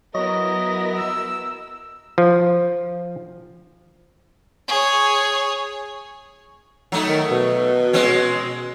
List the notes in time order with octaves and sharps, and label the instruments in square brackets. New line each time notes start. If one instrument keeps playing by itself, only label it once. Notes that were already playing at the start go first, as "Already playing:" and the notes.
[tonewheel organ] F#3 F#4 A#6 [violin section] B3 E4 A#4 [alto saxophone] D#5
[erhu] E6
[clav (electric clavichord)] F3
[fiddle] G#4 C#5
[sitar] F#3 A3 D#4
[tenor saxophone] D#3
B2
[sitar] G#3 C4 C#4